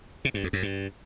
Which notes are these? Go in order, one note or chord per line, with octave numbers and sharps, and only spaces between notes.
C3
G2
F2
F#2
G2